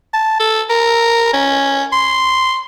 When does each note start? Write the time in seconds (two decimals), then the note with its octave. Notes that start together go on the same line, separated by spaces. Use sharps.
0.13 A5
0.39 A4
0.70 A#4
1.33 C#4
1.92 C6